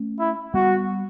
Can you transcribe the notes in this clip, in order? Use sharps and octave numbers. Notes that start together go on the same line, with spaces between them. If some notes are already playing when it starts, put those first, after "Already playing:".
Already playing: A3 C#4
E4
G3 B3 F#4